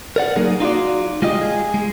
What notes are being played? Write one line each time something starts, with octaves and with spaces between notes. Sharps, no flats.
A#4 D5 F#5
F#3 A#3 D#4 G#4
D#4 F4 F#4 D5
G#3 F4 G4 D#5
G#4
G#3